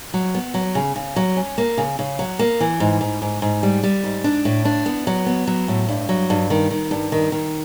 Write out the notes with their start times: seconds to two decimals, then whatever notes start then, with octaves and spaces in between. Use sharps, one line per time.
0.14 F#3
0.35 B3
0.54 F#3
0.75 C#3
0.96 C#3
1.16 F#3
1.36 C#4
1.58 A#3
1.77 C#3
1.99 C#3
2.19 F#3
2.39 A#3
2.60 E3
2.80 G#2
3.01 G#2
3.22 G#2
3.42 G#2
3.63 G3
3.83 G3
4.04 G#2
4.24 D4
4.45 A2
4.65 D4
4.86 B3
5.07 F#3
5.26 B3
5.47 F#3
5.68 A2
5.88 G2
6.09 F#3
6.30 G2
6.50 D#3
6.71 D#3
6.91 G2
7.12 D#3
7.32 D#3